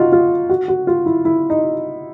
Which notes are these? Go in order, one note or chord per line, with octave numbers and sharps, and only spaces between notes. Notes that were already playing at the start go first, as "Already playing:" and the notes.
Already playing: D#4 F4 F#4
F4
F#4
F#4
F4
E4
E4
D#4